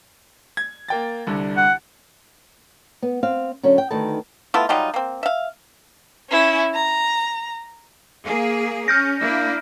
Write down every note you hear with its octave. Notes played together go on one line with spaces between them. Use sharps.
G#6
A#3 G5 A6
C2 D3
F#5
B3
C4 F5
D3 F#3 C#4
G5
D2 D#3 D#4 A4 B4 A5
A3 B3 E4 F4
F#3 G3 D#4 F4
A#3 C4
E5 F5
C#4 E4
A#5
A#3 G#4
C#4 F6 G6 A#6
A#3 D4 E4